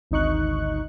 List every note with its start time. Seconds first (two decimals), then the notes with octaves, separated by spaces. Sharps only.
0.11 G#1 D2 D#4 C#6 F#6